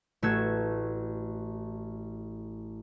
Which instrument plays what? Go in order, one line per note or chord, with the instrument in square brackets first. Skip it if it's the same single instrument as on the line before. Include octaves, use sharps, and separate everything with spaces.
[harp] A1 A3 F#4 E6 G#6 E7